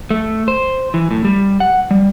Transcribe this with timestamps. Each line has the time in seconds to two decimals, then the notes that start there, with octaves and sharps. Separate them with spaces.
0.11 A3
0.48 C5
0.94 E3
1.11 A2
1.25 G3
1.60 F#5
1.91 G3